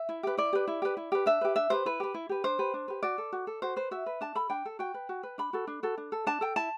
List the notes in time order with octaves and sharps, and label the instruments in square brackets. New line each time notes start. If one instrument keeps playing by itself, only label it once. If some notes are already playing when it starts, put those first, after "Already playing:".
Already playing: [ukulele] E5
E4
G4 B4
E4 D5
G4 B4
E4
G4 B4
E4
G4 B4
D4 E5
G4 B4
D4 E5
G4 B4 C5
E4 B4
G4 B4
E4
G4 B4
D4 C5
G4 B4
D4
G4 B4
F#4 D5
A4
F#4
A4
F#4 C5
B4 C5
F#4 E5
B4
D4 A5
A4 B5
D4 G5
A4
F#4 G5
B4
F#4
B4
D4 B5
F#4 A4
D4
F#4 A4
D4
A4
D4 A5
A4 G5
E4 A5